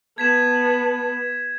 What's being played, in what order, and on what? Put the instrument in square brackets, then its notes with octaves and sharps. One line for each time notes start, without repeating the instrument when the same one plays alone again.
[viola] B3 [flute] A5 [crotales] G#6 B6 E7